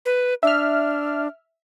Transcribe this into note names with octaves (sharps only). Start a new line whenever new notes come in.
B4
D4 E5 F6